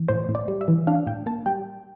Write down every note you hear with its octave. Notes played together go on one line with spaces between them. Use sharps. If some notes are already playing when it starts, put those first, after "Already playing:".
Already playing: E3
A2 C5
A2
D5
G3
E5
E3
D4 F5
A2 G5
A#3 A5
G3 G5